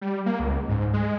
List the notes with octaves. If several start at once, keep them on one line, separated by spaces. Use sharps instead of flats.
G3
A#3
C#2
G#2
G#3